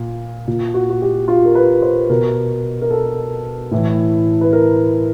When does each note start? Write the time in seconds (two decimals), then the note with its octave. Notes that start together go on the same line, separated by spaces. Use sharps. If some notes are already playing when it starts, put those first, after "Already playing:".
Already playing: A#2
0.47 A#2
0.74 F#4
0.89 F#4
1.02 G4
1.28 F4
1.45 A#4
1.55 B4
1.82 C5
2.10 B2 A#4
2.81 A#4
2.91 A4
3.71 A2 E3
4.41 B4
4.53 A#4